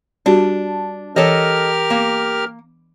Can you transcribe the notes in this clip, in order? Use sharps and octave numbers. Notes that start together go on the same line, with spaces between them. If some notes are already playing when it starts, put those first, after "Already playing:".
G3 D4 F#4 G4
E3 G4 A4 A#4 C#5 D#5 F6
A#3